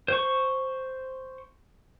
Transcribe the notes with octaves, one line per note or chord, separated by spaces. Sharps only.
C5 C#6